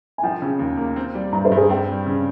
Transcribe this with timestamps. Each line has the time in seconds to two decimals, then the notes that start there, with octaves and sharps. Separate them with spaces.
0.18 G#5
0.23 F3 G5
0.42 C#3
0.59 D#2
0.77 A#3
0.96 C4
1.15 G3
1.32 G2 A#5
1.45 C5
1.52 G2
1.57 G#4
1.69 C4 G5
1.89 G3
2.06 C#3